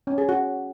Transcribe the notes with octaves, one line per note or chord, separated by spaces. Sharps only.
C#4
G#4
F#4